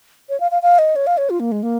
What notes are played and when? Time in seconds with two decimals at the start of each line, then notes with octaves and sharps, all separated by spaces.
0.29 C#5
0.40 F5
0.51 F5
0.62 F5
0.79 D#5
0.96 C#5
1.07 F5
1.18 C#5
1.30 F4
1.40 A#3
1.52 G#3
1.63 A#3